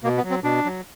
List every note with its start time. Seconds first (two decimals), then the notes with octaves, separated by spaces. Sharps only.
0.04 B2 A#3
0.17 B3
0.24 F#3
0.30 C4
0.44 B2 D4
0.65 F#3